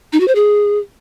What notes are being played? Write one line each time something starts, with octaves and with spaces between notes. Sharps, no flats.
D#4
F#4
C5
G#4